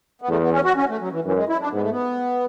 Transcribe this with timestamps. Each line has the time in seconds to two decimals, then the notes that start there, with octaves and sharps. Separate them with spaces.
0.22 B3
0.29 E2 A3
0.41 B3
0.52 C#4
0.64 F#4
0.76 C#4
0.89 A3
1.01 F#3
1.12 E3
1.24 F#2 E3
1.36 G#3
1.49 E4
1.61 D4
1.73 G#2 B3
1.81 A3
1.90 B3